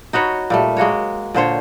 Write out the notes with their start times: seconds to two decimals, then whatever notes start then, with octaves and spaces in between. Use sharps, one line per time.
0.13 D#4 F#4 B4 C#5
0.50 A#2 G3 A3
0.77 G#3 A#3 F#4 C#5
1.34 A#2 D3 C5 C#5